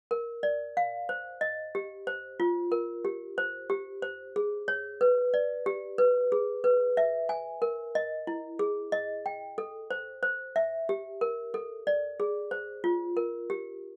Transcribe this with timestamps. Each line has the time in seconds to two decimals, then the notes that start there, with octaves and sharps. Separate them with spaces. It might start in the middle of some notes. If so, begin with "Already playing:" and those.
0.11 A#4
0.43 D5
0.77 F5
1.09 C5
1.41 D#5
1.75 G4
2.07 C5
2.40 F4
2.72 A#4
3.05 G4
3.38 C5
3.70 G4
4.02 C5
4.36 G#4
4.68 C#5
5.01 B4
5.34 D5
5.66 G4
5.98 B4
6.32 G#4
6.64 B4
6.97 E5
7.29 G#5
7.62 A#4
7.95 D#5
8.27 E4
8.59 G#4
8.92 D#5
9.26 G5
9.58 A4
9.91 C5
10.23 C5
10.56 E5
10.89 G4
11.21 A#4
11.54 A4
11.87 D5
12.20 G#4
12.51 C5
12.84 F4
13.17 A#4
13.50 G4